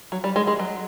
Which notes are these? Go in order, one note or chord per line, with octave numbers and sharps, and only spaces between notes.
F#3
G3
G#3
G#3
F#3